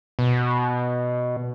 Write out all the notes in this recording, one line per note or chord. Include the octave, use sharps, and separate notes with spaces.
B2